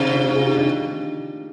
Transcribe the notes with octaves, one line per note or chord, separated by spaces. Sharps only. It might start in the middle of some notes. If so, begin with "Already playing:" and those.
Already playing: C3 C4 D#4 G4
D4 F4
D#4 G4
F4 G#4
D#4 G4
D4 F4